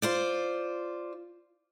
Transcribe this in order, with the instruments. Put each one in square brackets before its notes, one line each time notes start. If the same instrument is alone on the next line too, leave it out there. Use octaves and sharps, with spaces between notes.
[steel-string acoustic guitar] F4 C5 D5